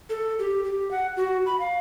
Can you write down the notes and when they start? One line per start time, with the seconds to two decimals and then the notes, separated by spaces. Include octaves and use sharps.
0.10 A4
0.39 G4
0.64 G4
0.91 F#5
1.17 F#4
1.46 B5
1.60 F5